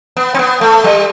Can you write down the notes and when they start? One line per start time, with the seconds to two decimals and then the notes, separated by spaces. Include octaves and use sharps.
0.17 B3
0.34 C4
0.39 B3
0.61 A3
0.84 G3